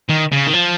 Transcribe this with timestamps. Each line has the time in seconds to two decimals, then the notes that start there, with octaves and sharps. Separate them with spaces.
0.10 D#3
0.32 C#3
0.47 D#3
0.54 F3